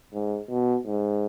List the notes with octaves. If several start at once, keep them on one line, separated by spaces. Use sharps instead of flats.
G#2
B2
G#2